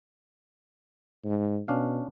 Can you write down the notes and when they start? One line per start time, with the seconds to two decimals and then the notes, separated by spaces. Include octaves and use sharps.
1.25 G#2
1.68 B2 C#4 D4 F5